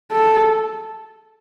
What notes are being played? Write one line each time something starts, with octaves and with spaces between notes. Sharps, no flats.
A4